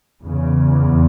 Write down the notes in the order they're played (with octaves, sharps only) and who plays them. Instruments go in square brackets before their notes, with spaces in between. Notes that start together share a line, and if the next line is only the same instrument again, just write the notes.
[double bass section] E2 C#3